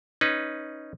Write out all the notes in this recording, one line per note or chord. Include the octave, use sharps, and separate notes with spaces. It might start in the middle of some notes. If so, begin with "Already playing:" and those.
C#4 D#4 B4